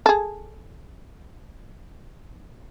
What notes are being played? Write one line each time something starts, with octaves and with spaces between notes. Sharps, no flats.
G#4 A4